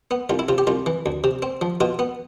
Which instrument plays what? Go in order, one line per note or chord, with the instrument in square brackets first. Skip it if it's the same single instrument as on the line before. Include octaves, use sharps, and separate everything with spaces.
[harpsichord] B3
C2 F4
E4
C3 F4
G4
C2 F4
E3
D2
C3
C4
F3
B2 F4
B3